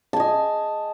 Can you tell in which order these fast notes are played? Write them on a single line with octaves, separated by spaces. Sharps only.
A5 G#5 D#5